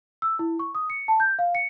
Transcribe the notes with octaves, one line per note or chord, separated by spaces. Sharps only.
E6
E4
C#6
D#6
C#7
A5
G6
F5
C#7